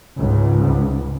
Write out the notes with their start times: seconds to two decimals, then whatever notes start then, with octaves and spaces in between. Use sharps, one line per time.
0.17 C#2 G#2